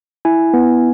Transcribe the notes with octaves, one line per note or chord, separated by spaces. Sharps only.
E4 G#5
B3